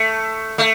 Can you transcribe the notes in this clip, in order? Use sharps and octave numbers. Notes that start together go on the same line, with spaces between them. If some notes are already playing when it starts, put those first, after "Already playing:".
Already playing: A3
A3